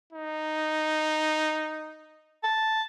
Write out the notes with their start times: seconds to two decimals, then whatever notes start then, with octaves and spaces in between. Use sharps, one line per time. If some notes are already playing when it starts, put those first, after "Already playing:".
0.13 D#4
2.44 A5